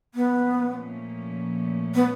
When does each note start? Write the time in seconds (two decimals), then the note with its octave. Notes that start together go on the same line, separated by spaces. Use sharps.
0.15 A#2 F3 A3 B3 C#4
1.94 B3